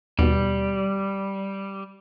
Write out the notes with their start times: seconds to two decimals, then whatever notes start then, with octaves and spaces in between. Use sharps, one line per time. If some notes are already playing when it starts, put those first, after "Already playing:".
0.19 D#2 B2 G3